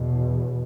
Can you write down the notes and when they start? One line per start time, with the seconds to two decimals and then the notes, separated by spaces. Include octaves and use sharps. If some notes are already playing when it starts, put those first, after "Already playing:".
Already playing: E2 B2